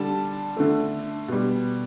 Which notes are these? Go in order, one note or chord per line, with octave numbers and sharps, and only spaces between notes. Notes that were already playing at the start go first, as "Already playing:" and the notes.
Already playing: D3 G3 A5
D3 A3
B2 G3